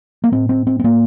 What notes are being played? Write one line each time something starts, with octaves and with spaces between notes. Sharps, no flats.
A#3
A2 C4
C4
C4
C4
A2 A#3